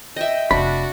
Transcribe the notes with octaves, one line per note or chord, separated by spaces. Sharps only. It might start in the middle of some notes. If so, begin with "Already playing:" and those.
D#5 E5 G5
F1 D4 F#4 B5